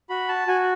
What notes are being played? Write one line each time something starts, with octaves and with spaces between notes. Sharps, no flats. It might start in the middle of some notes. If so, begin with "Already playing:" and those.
F#4 B5
A5
F#4 G#5